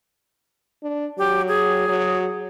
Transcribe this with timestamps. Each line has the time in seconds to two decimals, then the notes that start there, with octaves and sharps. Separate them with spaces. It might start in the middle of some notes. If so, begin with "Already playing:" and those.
0.83 D4
1.18 F#3 G4
1.48 G#4
1.88 F#3